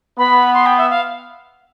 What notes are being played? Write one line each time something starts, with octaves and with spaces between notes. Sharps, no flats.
B3 B5
C6
G5
E5
F5